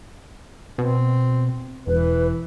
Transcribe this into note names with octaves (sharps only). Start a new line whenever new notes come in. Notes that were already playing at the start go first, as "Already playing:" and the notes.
B2 C4
E1 E3 B4